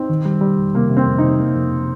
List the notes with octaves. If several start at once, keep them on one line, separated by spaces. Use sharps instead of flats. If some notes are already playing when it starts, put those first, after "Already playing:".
Already playing: C4 D#4
D#3
G3
G3
F2
C3 A#3
C3
C4
F2
C3 D#4
A#3
F2